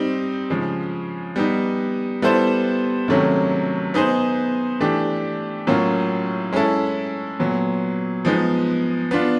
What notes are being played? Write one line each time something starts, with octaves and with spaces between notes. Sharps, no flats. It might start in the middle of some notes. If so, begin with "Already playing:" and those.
Already playing: G3 C4 D#4
C#3 F3 G#3
G3 B3 D#4
G3 B3 E4 A4 C5
C3 D#3 F#3 A3 C#4
B3 D#4 G#4 C5
E3 A3 D4 G4
A2 F#3 A#3 C#4 F4
G#3 C#4 E4 A4
A#2 F#3 B3
F3 G#3 B3 D#4
B3 D4 F4